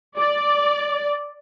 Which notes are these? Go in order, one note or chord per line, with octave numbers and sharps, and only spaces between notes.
D5